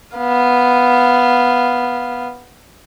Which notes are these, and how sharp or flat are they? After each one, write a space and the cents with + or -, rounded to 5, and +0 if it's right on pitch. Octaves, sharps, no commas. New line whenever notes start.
B3 +0 F5 +0